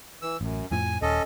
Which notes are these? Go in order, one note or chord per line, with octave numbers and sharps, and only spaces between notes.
E3 E6
A1 F#2
F2 A2 F3 G#5
D#1 C#4 A4 D#5